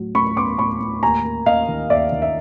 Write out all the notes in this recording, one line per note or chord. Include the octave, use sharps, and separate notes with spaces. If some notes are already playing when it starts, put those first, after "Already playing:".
Already playing: A2 F#3
A2 B5 C#6
B3 C6 D6
A2 B5 C#6
A2
D#2 G#5 A#5
A#3
A#3 D#5 F5
D#3
D#2 D5 E5
D#3
E5